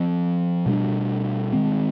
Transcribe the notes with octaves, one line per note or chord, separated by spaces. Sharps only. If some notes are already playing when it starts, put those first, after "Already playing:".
Already playing: F3 C4
B2 G3 B3 D4
D#3 G#3 C4